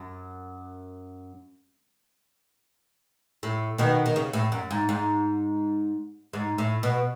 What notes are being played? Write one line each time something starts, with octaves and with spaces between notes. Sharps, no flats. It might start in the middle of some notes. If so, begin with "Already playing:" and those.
Already playing: F#2
A2
B2 D#3
D#3
C#3
A2
F#2
G#2
G#2
G#2
A2
B2